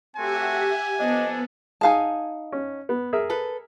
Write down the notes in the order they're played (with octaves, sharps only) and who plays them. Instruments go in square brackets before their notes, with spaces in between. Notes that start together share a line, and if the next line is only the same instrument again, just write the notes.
[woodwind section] A3 C4 F#4 [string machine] G4 E5 F#5 [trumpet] G#5
[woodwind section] F3 D4 A4 [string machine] B3 [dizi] D#5
[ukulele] D#4 F5 A5 [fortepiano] G#4 G#5
[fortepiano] C#4
B3
G#4 A#4 E5
[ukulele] A4 B4